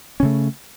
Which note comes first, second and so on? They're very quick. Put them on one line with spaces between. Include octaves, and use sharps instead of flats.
C#4 C#3 A3